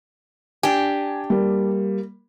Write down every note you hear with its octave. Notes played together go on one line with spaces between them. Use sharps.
D4 G4 G#5
G3 A#3